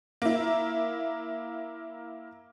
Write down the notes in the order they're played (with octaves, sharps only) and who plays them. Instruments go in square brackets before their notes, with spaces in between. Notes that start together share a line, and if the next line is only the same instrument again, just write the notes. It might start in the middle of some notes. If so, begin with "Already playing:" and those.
[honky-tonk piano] A#3 E4